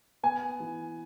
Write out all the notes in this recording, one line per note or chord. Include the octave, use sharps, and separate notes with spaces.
B3 G#5
E3